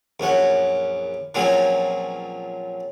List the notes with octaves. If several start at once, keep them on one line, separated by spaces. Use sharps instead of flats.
A#1 F#2 C#4 F#5
A#2 F3 F#3 C4 C#4 G#4